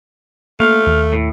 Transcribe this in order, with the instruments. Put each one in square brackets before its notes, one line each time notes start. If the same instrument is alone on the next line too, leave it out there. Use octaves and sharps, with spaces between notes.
[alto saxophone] A3 [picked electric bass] A#3 [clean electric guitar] F5
[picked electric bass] D#2
[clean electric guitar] A2